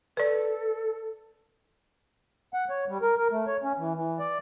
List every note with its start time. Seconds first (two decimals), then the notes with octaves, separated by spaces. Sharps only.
0.17 A4 B4 D5
2.54 F#5
2.70 C#5
2.89 G3
3.02 A#4
3.17 A#4
3.31 A3
3.47 C#5
3.63 C#4
3.78 E3
3.97 E3
4.19 D5